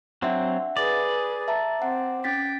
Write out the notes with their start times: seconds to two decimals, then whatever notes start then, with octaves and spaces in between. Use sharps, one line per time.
0.22 F#3 C4 D4 E5 F#5
0.77 G#4 B4 D5
1.48 E5 A5 A#5
1.82 C4 F#5
2.24 C#4 G5 A6 B6